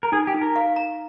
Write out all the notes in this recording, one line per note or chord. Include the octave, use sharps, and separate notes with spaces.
A#4
D#4 G#4
G4
D#4
A#4
F5
A#5